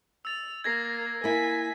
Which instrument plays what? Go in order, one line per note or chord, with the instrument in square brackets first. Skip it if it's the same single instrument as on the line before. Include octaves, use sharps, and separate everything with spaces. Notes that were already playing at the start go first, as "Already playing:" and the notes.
[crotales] E6 A6 [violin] F7
[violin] A#3 [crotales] G#6 A#6 C7
[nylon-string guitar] A#3 E4 [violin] G#5 B6